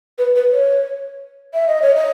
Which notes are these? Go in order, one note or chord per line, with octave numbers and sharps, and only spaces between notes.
B4
B4
C#5
E5
D#5
C#5
D#5